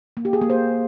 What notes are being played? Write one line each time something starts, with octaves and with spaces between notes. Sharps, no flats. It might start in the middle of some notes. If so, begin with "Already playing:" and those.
A#3
G4
G#4
A#3
C5